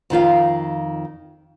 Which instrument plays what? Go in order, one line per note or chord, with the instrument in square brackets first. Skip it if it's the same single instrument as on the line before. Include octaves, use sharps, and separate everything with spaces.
[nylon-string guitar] F2 D#3 F4 F5